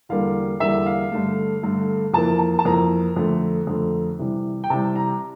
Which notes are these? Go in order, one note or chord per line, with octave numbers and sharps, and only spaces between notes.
E2 D3 G3 A#3 F5
E2 D3 G3 A#3 E5
F5
G2 D3 A3
G2 D3 A3
F2 E3 A#3 A5
A5
A5
F2 E3 A#3 A#5
F2 D3 A3
F2 D3 A3
C3 E3 G3
G5
C3 E3 G3 A5
A#5